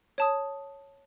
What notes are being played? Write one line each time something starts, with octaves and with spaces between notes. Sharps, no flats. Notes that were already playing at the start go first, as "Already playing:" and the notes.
C#5 A5 D#6